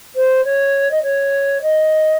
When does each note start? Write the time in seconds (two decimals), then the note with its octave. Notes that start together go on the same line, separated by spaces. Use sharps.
0.16 C5
0.44 C#5
0.91 D#5
1.02 C#5
1.62 D#5